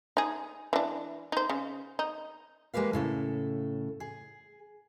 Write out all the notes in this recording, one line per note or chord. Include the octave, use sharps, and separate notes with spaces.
D#4 G#4
E3 D4
D#4 C5
C#3
D#4
G#3 A#3 G4 B4 F5
A2 C#3 A4
G#4